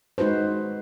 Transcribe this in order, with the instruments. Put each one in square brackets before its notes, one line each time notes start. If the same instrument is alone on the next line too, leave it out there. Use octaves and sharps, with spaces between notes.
[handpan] G#3 D#4 F#4 B4 C5